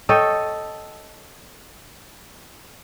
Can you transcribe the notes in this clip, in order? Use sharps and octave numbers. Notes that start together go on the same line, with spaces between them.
A4 C#5 D#5 G5